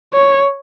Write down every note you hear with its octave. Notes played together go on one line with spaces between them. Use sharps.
C#5